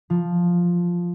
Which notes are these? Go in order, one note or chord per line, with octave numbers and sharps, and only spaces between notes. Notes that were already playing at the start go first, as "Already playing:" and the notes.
F3